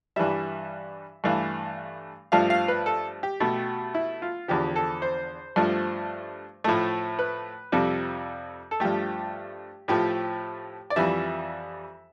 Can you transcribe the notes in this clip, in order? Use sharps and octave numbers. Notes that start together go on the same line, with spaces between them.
G2 E3 G3 E5
G2 E3 A3 F5
G2 F3 A3 F5
F5
B4
A4
G4
B2 A3
E4
F4
E2 D3 F3 G4
A4
C5
G2 F3 A3
A2 F3 A3
B4
F2 C3 G3 A4
A4
G2 F3 A3 G4
A2 F3 A3 G4
D5
F2 E3 G3 E5